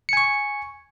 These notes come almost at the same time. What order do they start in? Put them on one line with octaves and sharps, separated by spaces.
C#7 G#5 C#6